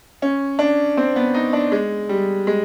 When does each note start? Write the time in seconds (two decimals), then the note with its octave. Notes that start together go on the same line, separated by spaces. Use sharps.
0.22 C#4
0.59 D4
0.97 C4
1.16 B3
1.34 D#4
1.53 D4
1.72 G#3
2.09 G3
2.47 G#3